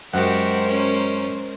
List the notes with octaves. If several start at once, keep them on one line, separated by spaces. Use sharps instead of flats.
F#2 G#3 F#4 G4 A#4 C5 F#5
C#4